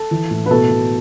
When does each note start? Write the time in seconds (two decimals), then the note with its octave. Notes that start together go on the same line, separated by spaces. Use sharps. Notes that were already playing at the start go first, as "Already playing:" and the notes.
Already playing: A4
0.11 E3
0.31 A2
0.46 B4
0.51 B2 A4
0.70 B2